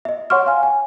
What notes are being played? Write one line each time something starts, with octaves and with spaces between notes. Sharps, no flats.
D#5 E5
C#5 F#5 C6 C#6 F6
F5 G#5
G#5